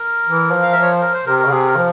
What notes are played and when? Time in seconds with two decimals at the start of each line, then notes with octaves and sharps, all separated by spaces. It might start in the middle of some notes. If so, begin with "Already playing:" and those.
Already playing: A#4
0.27 E3
0.51 F3
0.63 F5
0.73 F3 E5
0.82 C#5
0.92 C5
1.01 A#4
1.14 C5
1.26 C3 A#4
1.39 A#4
1.45 C#3
1.51 C3 G#4
1.67 A#4
1.77 F3